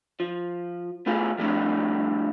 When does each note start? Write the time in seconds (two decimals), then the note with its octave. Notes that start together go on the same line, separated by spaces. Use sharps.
0.20 F3
1.06 A3 B3 E4 F4 G#4
1.38 F3 G3 A3 D4 E4